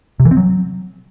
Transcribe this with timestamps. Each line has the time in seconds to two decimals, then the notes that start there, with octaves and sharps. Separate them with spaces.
0.20 C3
0.25 E3
0.31 C4
0.37 F#3